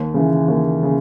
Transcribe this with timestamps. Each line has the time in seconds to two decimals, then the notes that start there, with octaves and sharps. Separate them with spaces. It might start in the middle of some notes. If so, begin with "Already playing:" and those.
Already playing: D#2
0.14 C#3 E3
0.48 D#2
0.83 C#3